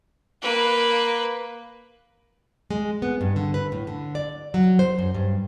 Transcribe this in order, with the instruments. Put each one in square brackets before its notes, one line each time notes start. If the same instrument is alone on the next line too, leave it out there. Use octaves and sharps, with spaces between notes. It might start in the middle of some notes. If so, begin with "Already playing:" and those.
[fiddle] A#3 B4
[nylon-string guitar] G#3
B3
G2
D3
B4
A2
D3
D5
F#3
C5
F#2
G2